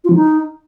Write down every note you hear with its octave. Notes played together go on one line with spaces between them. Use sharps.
F4
F3
D#4